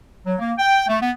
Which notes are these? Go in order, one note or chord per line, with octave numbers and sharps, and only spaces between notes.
F#3
A#3
G5
A3
B3